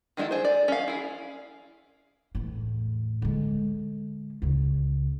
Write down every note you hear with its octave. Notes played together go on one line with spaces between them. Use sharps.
D#3 G#3 D#4 E4 A4
G#4 C5
D5
C#4 F5
E4 G#4
E2 A2
D3 G#3
C#2 C#3